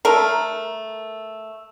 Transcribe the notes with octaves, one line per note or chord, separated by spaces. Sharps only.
A3 A#4